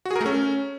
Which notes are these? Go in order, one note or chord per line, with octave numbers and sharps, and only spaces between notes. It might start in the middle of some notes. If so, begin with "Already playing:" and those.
F#4
G#4
A#4
A3
C#4